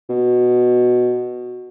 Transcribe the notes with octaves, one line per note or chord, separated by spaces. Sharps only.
B2